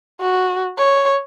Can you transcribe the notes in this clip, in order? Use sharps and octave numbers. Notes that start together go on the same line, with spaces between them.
F#4
C#5